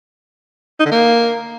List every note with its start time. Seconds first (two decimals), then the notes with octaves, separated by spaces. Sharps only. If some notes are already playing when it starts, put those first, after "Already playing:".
0.80 D#4
0.86 D3
0.91 A#3